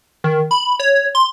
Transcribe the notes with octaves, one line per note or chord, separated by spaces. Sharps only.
D#3
B5
C#5
C6